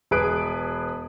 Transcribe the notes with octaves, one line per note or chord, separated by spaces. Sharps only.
E1 G#4 B4 D7